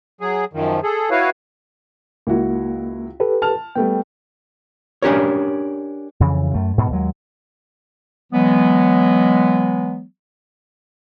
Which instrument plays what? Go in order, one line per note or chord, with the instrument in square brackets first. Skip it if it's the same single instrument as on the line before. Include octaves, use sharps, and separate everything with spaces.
[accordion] F#3 G#4
F#2 D#3 F3
G#4 A4
E4 F#4 B4 C#5 F5
[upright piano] C#2 E4 F#4 [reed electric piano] A#3
[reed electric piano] G4 A4 B4
[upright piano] A5 F6 F7
[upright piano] G3 A3 B3 [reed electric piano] G5
[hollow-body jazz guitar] C#4 D4 G4 A#4 C#5
[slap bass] F2 C#3 E3
F#2 A3
G#2 B2
D#2 F#3 G#3
[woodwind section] E3 F#3 G#3 B3